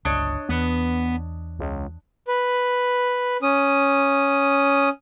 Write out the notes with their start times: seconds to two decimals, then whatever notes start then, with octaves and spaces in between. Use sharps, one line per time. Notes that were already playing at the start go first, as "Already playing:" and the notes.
0.05 G1 C#2 D4 C#5 D#5
0.49 E2 B3
1.59 C#2
2.28 B4
3.43 C#4 D#6